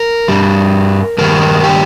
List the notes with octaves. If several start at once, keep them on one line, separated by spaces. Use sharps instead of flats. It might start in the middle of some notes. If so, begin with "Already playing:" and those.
Already playing: A#4
G2 G3
G2 D#3 G3 A#4
G4